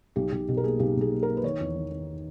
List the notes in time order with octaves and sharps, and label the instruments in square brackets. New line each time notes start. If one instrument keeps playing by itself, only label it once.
[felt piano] B1 G4
B1 G4
B2 G4
A#4
A#3 G#4
B1 G4
B1 G#4
A#3
A#3 A#4
B4
D#3 C#5
E2
D#3
D#3